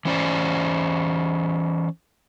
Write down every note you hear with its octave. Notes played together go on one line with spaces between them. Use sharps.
E3 C#4 C5 D5